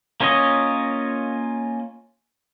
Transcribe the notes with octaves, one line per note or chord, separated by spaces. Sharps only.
A#3 C#4 F4 C#5 D#5